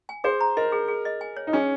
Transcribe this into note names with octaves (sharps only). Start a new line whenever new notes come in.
G#5
G#4 C5
A#5
A#4 D#5
G#4
G#4
D#5
G#5
C#5
D#4
C#4 G#4